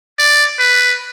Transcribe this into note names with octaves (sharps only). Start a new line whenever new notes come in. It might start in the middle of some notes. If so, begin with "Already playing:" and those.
D5
B4